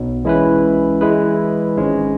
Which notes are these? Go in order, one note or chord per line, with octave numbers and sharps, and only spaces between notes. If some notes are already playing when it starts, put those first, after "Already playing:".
Already playing: B1 B2 F#3
E3 G#3 C#4 E4 B4
E3 G#3 E4 G#4 B4
G#1 G#2 G#3 C#4